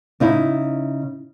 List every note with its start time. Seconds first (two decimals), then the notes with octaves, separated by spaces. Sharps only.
0.20 C#3 D#4 E4